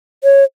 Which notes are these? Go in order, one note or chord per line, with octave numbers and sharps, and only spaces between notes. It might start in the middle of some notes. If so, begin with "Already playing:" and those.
C#5